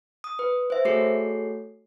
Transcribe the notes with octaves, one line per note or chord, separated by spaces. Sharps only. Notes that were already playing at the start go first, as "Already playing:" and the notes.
D#6
B4
C5 E5
A3 F#4 G#4 A4 C#5 C7